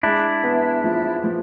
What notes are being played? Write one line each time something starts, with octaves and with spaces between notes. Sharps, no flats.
G#3 D4 E4
B3
F3
F3